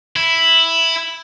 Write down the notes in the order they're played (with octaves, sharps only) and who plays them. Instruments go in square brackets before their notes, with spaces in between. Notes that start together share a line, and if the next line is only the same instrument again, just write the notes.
[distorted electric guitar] E4